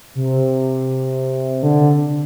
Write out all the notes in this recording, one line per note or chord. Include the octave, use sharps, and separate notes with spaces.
C3
D3